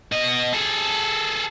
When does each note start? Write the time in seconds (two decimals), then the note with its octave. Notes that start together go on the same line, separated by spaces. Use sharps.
0.12 B2 D#5
0.53 G#4 A4